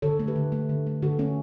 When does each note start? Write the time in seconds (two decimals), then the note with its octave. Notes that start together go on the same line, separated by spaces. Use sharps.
0.02 D3 A4 C#5
0.19 A3
0.27 G4 B4
0.36 D3
0.52 A3
0.69 D3
0.87 A3
1.02 D3 F#4 A4
1.19 A3 C#4